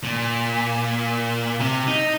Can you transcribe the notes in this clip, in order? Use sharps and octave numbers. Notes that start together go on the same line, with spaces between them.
A#2
C3
D#4